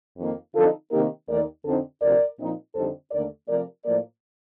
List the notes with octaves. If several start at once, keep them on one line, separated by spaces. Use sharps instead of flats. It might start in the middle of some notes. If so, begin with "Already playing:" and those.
F2 D#3 A#3 D#4
D3 F3 C4 D#4 F4 A4
C3 D#3 A#3 D#4 G4 A#4
D#2 D#3 A3 D#4 A#4 D5
F2 D3 F3 C4 D#4 A4 C5
D2 C3 F3 A#4 D5
A#2 F3 C4 D#4
F2 D3 G3 C4 D#4 A4 C5
D#2 D3 A3 A#4 D5
C3 F3 A3 A#4 D5
A2 F3 A#3 A#4 D5